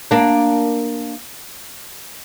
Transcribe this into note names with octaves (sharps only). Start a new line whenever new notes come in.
A#3 D4